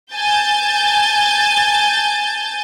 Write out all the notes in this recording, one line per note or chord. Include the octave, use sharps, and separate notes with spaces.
G#5 A5 G6 A6